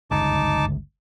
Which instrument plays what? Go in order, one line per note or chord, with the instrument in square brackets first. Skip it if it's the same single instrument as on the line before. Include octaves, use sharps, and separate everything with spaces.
[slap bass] G1 C#2 F#2 [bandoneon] D#4 A5 D6